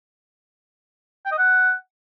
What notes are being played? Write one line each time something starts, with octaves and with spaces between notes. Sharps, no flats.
G5
D#5
F#5